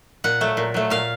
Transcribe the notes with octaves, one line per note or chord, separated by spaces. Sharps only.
A#2 F#5
F#3 A3
A#2
F#3 A3
A#2 F5